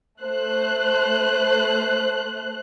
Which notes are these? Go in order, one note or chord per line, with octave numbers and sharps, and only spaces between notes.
A3 C5 F#6